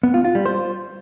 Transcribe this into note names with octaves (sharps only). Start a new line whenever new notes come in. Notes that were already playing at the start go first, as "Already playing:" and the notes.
B3
F4
F4
G3
C5